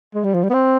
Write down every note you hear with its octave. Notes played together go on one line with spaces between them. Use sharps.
G#3
G3
F3
G3
B3
C4